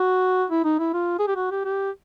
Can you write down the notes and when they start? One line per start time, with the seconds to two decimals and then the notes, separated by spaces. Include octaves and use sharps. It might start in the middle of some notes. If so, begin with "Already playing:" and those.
Already playing: F#4
0.50 E4
0.64 D#4
0.79 E4
0.94 F4
1.19 G#4
1.27 G4
1.36 F#4
1.51 G4
1.65 G4